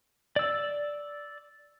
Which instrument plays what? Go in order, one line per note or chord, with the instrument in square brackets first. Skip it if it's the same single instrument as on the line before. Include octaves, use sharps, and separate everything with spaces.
[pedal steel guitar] D5 E6